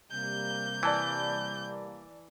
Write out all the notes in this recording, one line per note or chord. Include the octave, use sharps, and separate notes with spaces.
C3 G3 A#3 G6
E3 D5 A5 B5